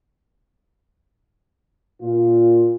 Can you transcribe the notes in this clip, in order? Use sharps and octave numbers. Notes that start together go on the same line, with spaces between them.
A#2 F4